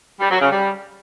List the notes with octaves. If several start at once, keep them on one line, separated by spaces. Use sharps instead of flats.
G3
F#3
C#3
G3